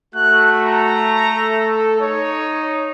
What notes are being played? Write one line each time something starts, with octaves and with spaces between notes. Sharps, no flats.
A3 F#4 F#6
A#5
A4
D#4 C#5